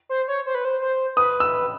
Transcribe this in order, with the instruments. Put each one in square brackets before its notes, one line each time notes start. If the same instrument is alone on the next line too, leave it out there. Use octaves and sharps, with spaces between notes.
[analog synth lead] C5
C#5
C5
B4
C5
C5
[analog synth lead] B4 [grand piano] D#6
[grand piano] E6